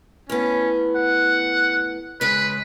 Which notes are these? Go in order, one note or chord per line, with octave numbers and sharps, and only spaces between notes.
A2 B3 C#4
F#5
C#3 G#3 B4